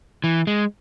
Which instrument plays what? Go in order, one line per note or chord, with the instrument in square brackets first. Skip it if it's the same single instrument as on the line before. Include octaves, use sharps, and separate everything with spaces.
[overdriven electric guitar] E3
G#3